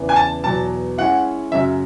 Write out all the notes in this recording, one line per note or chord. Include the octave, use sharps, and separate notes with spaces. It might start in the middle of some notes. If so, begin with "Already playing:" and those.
Already playing: E2 C#3 E3 B3
G#5
A5
E2 B2 F#3 A5
G#3 C#4 E4 F#5
F#2 C#3 F#3 E5